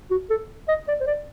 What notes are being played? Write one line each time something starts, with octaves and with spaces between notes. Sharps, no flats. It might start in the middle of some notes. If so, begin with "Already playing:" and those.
F#4
A4
D#5
D5
C5
D5